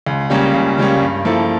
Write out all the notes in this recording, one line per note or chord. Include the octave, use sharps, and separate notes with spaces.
C#2
C#3 G3 A#3 C#4
C#2
C#3 G3 A#3 C#4
G2
F3 A#3 E4 A4